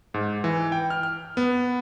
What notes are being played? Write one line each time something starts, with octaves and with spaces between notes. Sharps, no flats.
G#2
E3
G5
F6
F6
B3